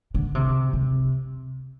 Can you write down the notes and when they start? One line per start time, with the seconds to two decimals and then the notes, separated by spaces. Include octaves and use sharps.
0.14 D3
0.35 C3
0.73 C3